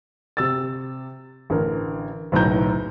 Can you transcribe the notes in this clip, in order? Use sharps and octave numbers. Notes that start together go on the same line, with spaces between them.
C3 E6 A6
A1 D3 A#4
F#1 B1 A2 B4 A#5 G6